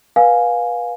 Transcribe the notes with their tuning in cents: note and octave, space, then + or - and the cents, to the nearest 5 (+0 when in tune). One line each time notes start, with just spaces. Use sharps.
B4 -25 F5 +20 G#5 +0